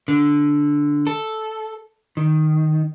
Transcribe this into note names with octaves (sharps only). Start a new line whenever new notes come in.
D3
A4
D#3